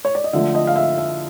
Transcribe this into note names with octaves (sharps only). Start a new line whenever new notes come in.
C#5
D5
D#5
D3 F3 A3 E5
D#5
F5
E5
E5